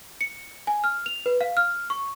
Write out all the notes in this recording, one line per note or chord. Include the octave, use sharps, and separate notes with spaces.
C#7
G#5
F6
F7
B4
F5
F6
C#6